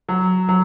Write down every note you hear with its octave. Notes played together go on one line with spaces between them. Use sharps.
F#3
F#3